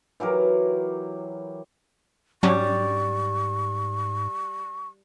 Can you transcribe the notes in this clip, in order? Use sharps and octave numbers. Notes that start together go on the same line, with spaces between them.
E3 F#3 G4 A#4
G#2 F#3 G3 C#4 D4 C#6